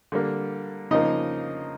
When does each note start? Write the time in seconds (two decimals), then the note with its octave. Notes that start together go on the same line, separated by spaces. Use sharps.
0.12 D3 G3 A#3
0.91 C#3 F3 A#3 D#4 D#5